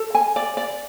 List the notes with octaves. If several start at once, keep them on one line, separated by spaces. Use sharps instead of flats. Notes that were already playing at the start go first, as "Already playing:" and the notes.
Already playing: A4
G#5
D5
D5